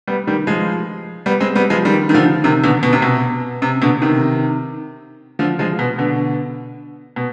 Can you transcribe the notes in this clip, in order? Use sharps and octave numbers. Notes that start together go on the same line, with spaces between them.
G3 B3
D#3 G3
F3 G#3
G3 B3
G#3 C4
G3 B3
F3 G#3
D#3 G3
D#3
D3 F3
C3 D#3
B2 D3
B2
C3
B2
C3
B2 D3
C3 D#3
D3 F3
F3 G#3
B2
B2 D3
B2